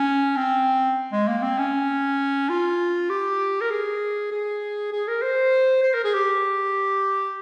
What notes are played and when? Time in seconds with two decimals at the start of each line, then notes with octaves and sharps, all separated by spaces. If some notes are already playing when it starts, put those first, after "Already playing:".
Already playing: C#4
0.36 C4
1.12 G#3
1.28 A#3
1.42 C4
1.58 C#4
2.50 F4
3.10 G4
3.61 A#4
3.71 G#4
4.32 G#4
4.92 G#4
5.08 A#4
5.22 C5
5.83 C5
5.94 A#4
6.04 G#4
6.14 G4